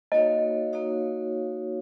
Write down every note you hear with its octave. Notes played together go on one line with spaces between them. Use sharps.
A#3 D#4 F#4 C#5 D#5 F5
A#3 D#4 F#4 C#5 F5